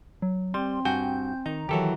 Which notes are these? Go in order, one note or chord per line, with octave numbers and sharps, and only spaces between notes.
F#3
G3 C4 C6
G2 F#4 G5 G#5 G6
D#3 D#4 A#5
D#3 E3 F#3 G4 A4 C#5